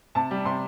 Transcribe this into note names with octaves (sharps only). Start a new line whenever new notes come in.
C3 A5
G3
C3 C6